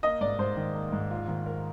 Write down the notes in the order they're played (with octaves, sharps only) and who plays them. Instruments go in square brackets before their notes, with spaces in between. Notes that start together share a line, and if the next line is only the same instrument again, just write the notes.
[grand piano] A#3 [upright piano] D#5
[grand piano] G#2 [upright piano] D5
[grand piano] G#2 [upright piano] C5
[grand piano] D#3
A#3
G#2
F4
D#3
A#4